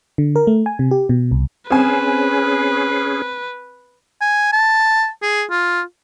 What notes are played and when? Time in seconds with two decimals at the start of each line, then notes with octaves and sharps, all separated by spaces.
0.18 D3
0.36 A#4
0.47 A3
0.66 G#5
0.79 C3
0.91 G4
1.09 B2
1.31 C2
1.70 C4 C#4 G#4 B4 G#5
4.21 G#5
4.53 A5
5.22 G#4
5.50 F4